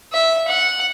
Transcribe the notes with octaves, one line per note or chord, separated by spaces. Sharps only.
E5
F#5